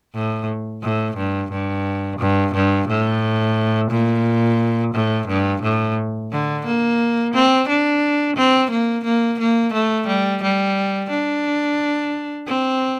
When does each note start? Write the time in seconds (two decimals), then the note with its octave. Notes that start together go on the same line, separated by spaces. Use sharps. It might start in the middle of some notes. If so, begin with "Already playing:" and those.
0.15 A2
0.83 A2
1.17 G2
1.52 G2
2.19 G2
2.54 G2
2.88 A2
3.91 A#2
4.94 A2
5.28 G2
5.62 A2
6.32 D3
6.66 A#3
7.34 C4
7.69 D4
8.37 C4
8.71 A#3
9.05 A#3
9.39 A#3
9.73 A3
10.07 G3
10.43 G3
11.10 D4
12.47 C4